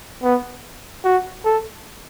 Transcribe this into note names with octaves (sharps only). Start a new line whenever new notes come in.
B3
F#4
A4